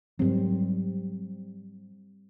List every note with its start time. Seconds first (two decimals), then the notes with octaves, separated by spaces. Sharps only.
0.19 G#2 F#3 G3 C4